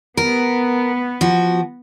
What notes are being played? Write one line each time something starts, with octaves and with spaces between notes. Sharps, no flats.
B3 A#4
F3 F#4